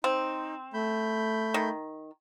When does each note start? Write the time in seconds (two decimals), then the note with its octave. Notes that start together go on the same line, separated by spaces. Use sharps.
0.04 C4 D#4
0.74 A3 B5 G6
1.54 D#3